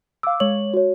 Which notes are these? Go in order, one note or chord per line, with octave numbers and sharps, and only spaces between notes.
F5 D6 E6
G#3 C#5 F#7
F#4 C#5